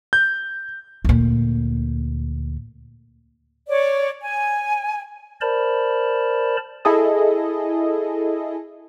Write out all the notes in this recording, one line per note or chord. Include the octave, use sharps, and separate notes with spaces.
G6
D2 A#2
C#5 D5
G#5
A#4 C5 D5 A5 B5
E4 G#4 A4 D#5